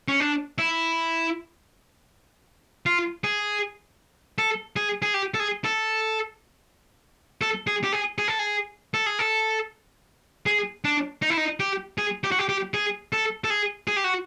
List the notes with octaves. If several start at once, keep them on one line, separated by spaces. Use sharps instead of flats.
C#4
D4
E4
F4
G#4
A4
G#4
G#4
G4
A4
G#4
A4
A4
G#4
G4
G#4
G#4
A4
G#4
A4
G#4
A4
G#4
D4
D#4
E4
D#4
G4
G#4
G4
F#4
G4
G4
G#4
A4
A4
G#4
G#4
G4
F#4